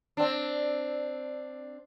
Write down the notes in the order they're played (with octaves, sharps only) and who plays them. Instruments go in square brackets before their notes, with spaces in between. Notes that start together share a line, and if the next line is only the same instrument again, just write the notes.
[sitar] C4 D4